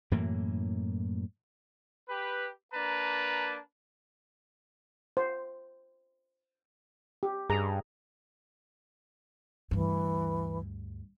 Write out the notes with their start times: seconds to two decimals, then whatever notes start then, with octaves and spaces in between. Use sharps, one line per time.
0.11 F#2 A2 E3 A#3
2.08 G4 B4
2.74 A#3 D4 B4 A5 A#5
5.17 C5
7.23 G4
7.50 G2 G#4 A#5
9.71 D2 G2 E3